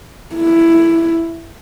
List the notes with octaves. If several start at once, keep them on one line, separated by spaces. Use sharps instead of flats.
E4